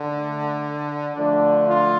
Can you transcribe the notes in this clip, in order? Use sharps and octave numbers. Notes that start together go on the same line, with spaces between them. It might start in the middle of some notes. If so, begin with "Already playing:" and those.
Already playing: D3
A3
D3 F3 A3 D4
F4